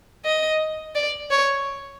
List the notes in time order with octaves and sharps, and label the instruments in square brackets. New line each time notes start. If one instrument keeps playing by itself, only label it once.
[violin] D#5
D5
C#5